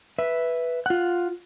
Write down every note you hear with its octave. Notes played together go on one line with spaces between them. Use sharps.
B4 E5
F4 F#5